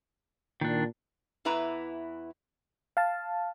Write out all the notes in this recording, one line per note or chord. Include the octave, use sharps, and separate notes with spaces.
A#2 D#3 D4
E2 E3 E4 B4 A#5
F5 A5